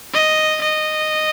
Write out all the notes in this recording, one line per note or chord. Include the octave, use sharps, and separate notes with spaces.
D#5
D#5